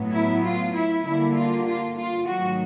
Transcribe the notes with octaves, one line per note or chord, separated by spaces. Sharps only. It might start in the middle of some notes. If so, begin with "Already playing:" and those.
Already playing: A2 F#3 B3
E4
F4
E4
D3 G3 A#3 E4
F4
F4
F4
G#2 D#3 F#3 A3 F#4